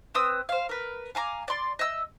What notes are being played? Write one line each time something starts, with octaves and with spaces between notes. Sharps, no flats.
C4 B4 D#6 E6
C5 F5
A#4 B4
F5 G#5 A#5 D6
D5 C6
D#5 E5 E6